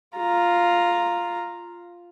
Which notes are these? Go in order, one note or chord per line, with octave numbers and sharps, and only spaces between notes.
F4 A#5